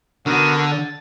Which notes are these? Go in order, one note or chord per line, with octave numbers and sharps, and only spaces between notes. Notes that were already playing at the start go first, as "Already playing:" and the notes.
D3 B3 F#4 A#4
A6